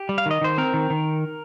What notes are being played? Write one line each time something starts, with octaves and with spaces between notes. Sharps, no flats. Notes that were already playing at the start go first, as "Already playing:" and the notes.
Already playing: G4
G3
F5
D#3 D#5
D#3 C5
C4 A#4
D#3
D#3